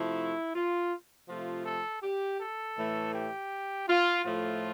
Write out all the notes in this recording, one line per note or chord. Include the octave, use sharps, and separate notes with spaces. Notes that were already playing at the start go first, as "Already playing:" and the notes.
Already playing: C3 F3 A3 E4
F4
C3 F3 A3 F4
A4
G4
A4
A2 E3 A3
G4
F4
A2 F3 A3 F4